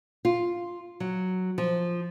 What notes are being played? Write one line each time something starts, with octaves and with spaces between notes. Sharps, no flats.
F4
F#3
F3